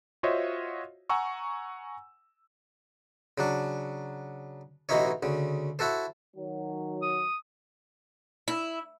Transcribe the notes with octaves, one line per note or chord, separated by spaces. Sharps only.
F4 F#4 C5 C#5 D#5 E5
F#5 G#5 A#5 C#6 E6
C#3 F#3 D4
A1 B2 E3 D#4 E4 C#5
D2 C#3
E4 F#4 A4 C5
D#3 F#3
D#6
E4